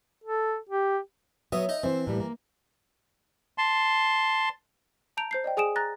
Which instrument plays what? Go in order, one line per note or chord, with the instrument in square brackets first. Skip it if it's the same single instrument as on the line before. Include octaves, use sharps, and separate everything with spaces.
[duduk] A4
G4
[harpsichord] F#3 B3 D#6 [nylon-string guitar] C#5 E5
[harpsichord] D#4 D#5
[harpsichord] E3 [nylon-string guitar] C4 C5
[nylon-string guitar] A2 G3 A#3
A#3
[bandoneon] A5 C6
[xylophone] A5 A#5 G6 D7 F7
C5 G6 C7
D5 D#5 G5
G#4 G#5 D#6 D7 E7
A#5 F#6 A6 A#6